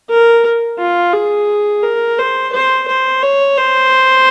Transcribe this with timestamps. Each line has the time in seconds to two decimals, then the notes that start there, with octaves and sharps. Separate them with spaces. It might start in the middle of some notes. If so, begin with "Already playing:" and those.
0.10 A#4
0.79 F4
1.13 G#4
1.83 A#4
2.19 C5
2.53 C5
2.88 C5
3.23 C#5
3.58 C5